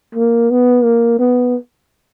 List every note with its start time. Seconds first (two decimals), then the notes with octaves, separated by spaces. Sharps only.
0.15 A#3
0.51 B3
0.84 A#3
1.19 B3